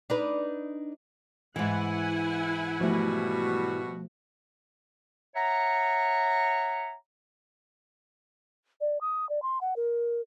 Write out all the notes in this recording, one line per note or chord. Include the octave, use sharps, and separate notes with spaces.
D4 D#4 B4
G#2 E3 E4 F#5 G#5
B2 F3 G3 A3 F#4
C#5 E5 F#5 A#5
D5
D#6
D5
C6
F#5
A#4